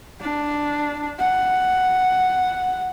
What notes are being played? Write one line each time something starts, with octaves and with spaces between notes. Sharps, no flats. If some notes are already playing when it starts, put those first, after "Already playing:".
D4
F#5